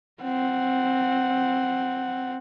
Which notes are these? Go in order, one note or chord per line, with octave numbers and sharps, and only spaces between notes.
C4 F#5